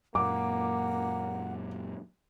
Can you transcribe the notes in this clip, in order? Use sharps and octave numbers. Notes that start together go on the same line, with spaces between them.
F#2 A#2 A#3 F#5 D6